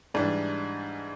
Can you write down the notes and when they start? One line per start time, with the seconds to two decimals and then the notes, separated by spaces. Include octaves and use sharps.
0.14 G#2 E3 G3 D4